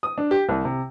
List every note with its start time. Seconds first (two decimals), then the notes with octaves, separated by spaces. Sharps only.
0.03 D#6
0.18 D4
0.31 G4
0.49 C2
0.65 C3